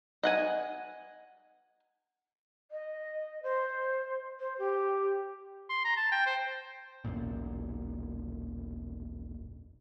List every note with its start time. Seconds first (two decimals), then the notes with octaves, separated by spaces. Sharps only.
0.23 D#5 F#5 G#5
2.71 D#5
3.43 C5
4.40 C5
4.59 G4
5.70 C6
5.85 A#5
5.96 A5
6.12 G5
6.26 C5
7.04 E1 B1 F#2 A#2